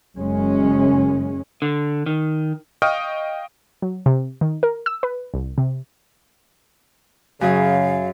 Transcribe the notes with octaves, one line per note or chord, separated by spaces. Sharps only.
F#1 F#2 G#3 C#4
D3
D#3
D#5 F5 G5 C#6 D#6 F6
F#3
C3
D#3
A#4
E6
B4
C2
C3
F#2 C#3 G#4 F5